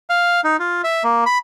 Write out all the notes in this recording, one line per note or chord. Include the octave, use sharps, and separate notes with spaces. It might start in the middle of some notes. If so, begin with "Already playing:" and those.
F5
D#4
F4
E5
A#3
B5